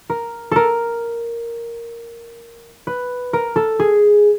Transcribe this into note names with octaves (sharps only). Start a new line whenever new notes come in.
A#4
A4 A#4
B4
A#4
A4
G#4